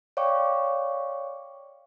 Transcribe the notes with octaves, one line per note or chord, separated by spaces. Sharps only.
C#5 D5 F5 G5 C#6 D6